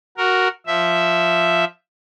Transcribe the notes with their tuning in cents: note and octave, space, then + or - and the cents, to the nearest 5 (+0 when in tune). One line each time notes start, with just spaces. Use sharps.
F#4 +0 A#4 +0
F3 +0 E5 +0